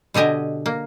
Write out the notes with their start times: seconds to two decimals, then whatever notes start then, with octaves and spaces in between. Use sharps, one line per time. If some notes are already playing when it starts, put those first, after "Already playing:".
0.14 B2 D3 G4 D#5 G#5
0.66 A#3